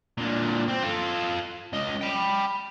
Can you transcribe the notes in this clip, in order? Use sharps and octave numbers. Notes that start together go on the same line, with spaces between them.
A#2 D3
C4
F4 A4
C#2 D#5
G5 B5